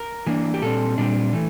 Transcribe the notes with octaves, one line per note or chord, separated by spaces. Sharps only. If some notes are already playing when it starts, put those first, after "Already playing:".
Already playing: A#4
E3 A#3 D4
G4
A#2 G3 C4 A4
A#2 G3 C4 D4
E3 A3